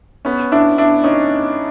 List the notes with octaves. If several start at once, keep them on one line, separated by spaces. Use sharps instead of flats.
B3 C#4
D4 E4
D4 E4
C#4 D#4